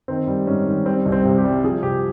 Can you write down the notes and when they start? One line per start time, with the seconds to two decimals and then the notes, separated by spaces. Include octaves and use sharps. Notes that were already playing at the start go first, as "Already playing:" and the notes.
0.08 D#3 C4
0.27 G3
0.47 G#2 C#4
0.67 D#3
0.86 G3 C4
1.06 C2
1.12 C4
1.25 C3
1.38 G4
1.44 G3
1.64 F3 G#4
1.83 C3 G4